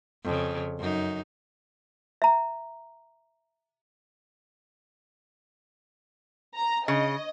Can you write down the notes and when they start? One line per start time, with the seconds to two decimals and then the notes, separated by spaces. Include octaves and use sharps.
0.24 F2 C#3
0.79 F#2 D#4
2.22 E5 A#5
6.56 A#5
6.88 C#3 D#5